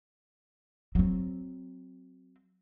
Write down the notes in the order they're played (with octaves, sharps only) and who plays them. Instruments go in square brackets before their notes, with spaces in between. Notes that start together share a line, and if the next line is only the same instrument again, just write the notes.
[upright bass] F#3 C4